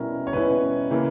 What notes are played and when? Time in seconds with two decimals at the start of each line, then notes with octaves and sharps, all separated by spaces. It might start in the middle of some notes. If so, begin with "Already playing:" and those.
Already playing: B2 G3 C#4 E4 A#4
0.27 C#5
0.33 B2 G3 C#4 E4 B4
0.90 C#3 E3 A#3